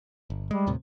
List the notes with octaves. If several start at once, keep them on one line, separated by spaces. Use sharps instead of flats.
G1
G3 G#3
D#2 A2 C3